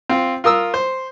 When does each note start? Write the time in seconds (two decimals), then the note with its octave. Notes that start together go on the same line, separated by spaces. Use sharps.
0.09 C4 F4
0.44 F4 A#4 D#6 E6
0.74 C5